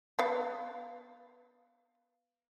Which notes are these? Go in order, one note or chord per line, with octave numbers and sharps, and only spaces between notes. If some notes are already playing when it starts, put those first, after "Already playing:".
B3 F5